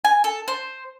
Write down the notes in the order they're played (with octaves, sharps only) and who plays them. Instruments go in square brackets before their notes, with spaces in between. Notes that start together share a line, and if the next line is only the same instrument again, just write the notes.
[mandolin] G#5
A4
C5